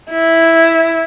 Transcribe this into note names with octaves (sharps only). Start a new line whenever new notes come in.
E4